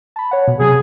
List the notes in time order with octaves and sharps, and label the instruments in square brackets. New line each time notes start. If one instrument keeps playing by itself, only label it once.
[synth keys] A5 B5
C#5 F#5
B2
[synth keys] C3 F#3 [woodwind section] G#4